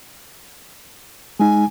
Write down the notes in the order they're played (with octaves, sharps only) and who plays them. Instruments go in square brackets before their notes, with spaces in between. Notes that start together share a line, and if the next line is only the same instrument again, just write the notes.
[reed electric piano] G#3 D#4 [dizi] G#5